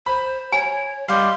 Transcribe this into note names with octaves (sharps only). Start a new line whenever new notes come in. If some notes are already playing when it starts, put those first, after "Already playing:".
C5 B5
C#5 G#5
G3 D#5 F5 C6